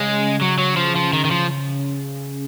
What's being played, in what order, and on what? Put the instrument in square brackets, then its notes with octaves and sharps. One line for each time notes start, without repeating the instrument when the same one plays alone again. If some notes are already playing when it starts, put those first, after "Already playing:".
Already playing: [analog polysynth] C#3 [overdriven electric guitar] G#3
[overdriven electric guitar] F#3
F#3
F3
F3
D#3
D#3
F3